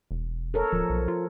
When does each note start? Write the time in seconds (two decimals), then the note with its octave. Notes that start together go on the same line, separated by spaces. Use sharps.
0.11 E1
0.54 A4 A#4 C#5
0.72 D1 F3
0.90 B1
1.08 F4